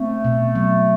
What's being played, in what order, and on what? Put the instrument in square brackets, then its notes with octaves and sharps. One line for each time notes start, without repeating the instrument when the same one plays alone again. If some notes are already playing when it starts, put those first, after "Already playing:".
Already playing: [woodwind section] A3 [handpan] C4
[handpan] B2
F#3